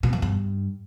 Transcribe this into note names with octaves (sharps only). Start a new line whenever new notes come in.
B2
F#2
G2